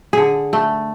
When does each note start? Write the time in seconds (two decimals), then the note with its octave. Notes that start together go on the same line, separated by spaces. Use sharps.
0.13 D3 G#4
0.53 A3